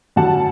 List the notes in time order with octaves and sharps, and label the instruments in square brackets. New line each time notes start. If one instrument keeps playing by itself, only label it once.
[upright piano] F#2 D3 G3 F#5 A5